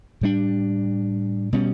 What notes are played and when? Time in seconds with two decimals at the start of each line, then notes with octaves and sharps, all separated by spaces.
0.21 A2 G3 D4
1.53 B2 G3 C#4